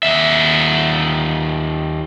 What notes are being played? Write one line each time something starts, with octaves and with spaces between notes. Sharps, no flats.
D#2 E5